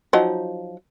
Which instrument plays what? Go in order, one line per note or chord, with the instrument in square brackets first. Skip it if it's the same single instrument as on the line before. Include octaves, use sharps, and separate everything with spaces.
[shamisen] F3 F#3 D#4